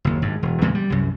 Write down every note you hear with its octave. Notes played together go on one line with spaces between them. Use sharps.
F#1 D#2
G#1 G2
E1
E2 A#2 C#3 G#3
G3
C2 F#2